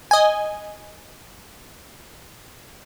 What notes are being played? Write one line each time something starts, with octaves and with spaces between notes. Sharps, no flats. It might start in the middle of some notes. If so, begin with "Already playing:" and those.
D#5 G#5